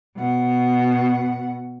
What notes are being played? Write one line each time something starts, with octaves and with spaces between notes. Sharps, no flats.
B2 F#5